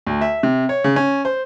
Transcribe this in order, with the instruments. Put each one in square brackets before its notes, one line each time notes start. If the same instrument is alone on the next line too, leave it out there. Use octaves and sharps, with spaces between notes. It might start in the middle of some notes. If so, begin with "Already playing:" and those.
[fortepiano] D2
E5
C3
C#5
C#3
C#4
C5